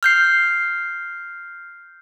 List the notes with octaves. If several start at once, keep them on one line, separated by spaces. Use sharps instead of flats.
F6 G6 C7